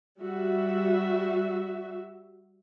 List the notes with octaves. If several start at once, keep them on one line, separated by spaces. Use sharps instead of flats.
G3 F#4 E5